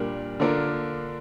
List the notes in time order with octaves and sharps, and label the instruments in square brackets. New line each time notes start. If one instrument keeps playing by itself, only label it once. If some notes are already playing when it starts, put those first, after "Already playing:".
Already playing: [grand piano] A#2 G3 D4 A#4
D3 A#3 D4 F4 A#4